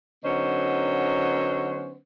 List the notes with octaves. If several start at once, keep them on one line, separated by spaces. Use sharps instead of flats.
D3 F#3 B3 C#4 D#4 C5